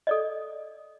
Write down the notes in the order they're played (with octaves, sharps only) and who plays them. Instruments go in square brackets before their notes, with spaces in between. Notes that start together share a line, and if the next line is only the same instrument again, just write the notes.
[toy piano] A4 D5 D#5